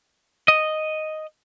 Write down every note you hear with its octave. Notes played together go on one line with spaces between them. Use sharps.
D#5